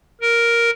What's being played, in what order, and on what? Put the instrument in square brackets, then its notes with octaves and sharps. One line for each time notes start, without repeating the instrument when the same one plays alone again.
[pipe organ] A#4